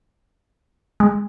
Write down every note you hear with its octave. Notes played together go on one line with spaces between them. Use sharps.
G#3